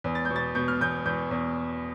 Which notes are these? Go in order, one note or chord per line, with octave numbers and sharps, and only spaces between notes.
E2
A6
B2 G6
A6
B2 G6
F6
E2 G6
E2 G6
E2